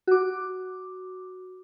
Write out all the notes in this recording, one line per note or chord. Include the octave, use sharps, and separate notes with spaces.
F#4 D6